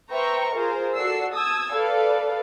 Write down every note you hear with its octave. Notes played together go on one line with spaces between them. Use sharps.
B4 C5 E5 G5 A#5 C#6
F4 G#4 A#4 C5
F#4 A4 D5 E6 C7
A5 D#6 E6 G#6
A4 B4 D5 F5